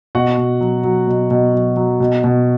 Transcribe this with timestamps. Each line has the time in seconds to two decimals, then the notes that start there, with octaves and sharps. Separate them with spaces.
0.15 B2 F#4 F#5
0.37 B2
0.61 F#3
0.84 F#3
1.07 B2
1.31 B2
1.54 F#3
1.77 F#3
2.00 B2
2.24 B2